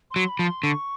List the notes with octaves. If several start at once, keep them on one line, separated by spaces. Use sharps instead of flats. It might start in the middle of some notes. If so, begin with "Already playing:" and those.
C6
F#3
B5
F3
C6
D3 C#6